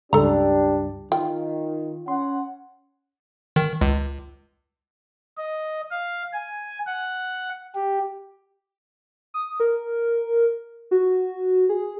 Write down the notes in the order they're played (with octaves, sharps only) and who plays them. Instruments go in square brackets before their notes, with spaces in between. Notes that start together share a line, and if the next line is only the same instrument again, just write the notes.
[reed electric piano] C#2 G2 G3 [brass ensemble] D4 G4 [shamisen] A4 A#5
[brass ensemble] D#3 [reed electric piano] F4 [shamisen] G5
[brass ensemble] C#4 F#5 [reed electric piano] C6
[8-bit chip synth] D#3
C#2
[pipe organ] D#5
F5
G#5
F#5
G4
[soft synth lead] D#6
A#4
F#4
G#4